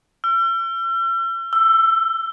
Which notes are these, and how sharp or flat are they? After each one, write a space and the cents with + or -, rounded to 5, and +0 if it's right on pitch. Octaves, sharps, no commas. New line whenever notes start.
E6 +45
E6 +15